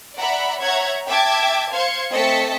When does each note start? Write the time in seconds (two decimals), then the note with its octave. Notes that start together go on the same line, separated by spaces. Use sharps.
0.16 D5 E5 F#5 A#5 B5
0.60 C#5 E5 F#5 A#5 G#6
1.06 E5 G5 A5 D6 G#6
1.71 C5 F5 C6 G#6 C#7
2.12 A3 C4 D#5 A5 B6 C#7